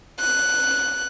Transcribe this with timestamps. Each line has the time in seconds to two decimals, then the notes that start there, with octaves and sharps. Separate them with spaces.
0.19 F#6